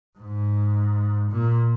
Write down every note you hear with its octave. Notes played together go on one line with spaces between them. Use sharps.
G#2
A#2